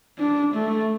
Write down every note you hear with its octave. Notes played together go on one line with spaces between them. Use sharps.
D4
A3